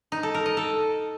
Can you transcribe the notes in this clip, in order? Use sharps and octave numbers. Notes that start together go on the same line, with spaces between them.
D#4
A4
A#4
D#5
A4